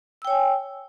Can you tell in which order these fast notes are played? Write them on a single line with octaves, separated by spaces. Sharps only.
E6 G5 C#5 G#5